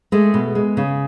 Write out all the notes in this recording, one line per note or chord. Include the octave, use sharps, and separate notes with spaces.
G#3 A3
B2
G#3
C#3